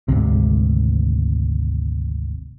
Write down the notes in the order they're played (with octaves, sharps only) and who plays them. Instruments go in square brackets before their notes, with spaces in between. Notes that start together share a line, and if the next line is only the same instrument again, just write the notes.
[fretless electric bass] G#1 D2 C3